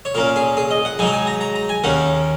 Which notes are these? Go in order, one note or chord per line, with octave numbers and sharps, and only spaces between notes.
C#5
A#2 A#3 C#4 A#4
G#4
G#4
D#5
F#5
G#2 F#3 D#4 G#5
A#5
G#5
A#5
A#5
A#5
G#5
D#2 D#3 A#3 C#4 F#5